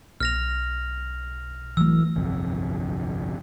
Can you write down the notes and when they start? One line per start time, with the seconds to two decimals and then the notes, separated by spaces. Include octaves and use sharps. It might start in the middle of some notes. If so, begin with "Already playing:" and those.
0.20 B1 F6 A#6 F7
1.77 E3 F#3 A3 E6
2.16 G1 C2 F2